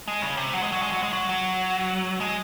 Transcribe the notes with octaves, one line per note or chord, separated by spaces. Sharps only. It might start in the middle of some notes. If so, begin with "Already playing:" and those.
G#3
C#3
C3
F#3
G#3
F#3
G#3
F#3
G#3
F#3
F#3
G#3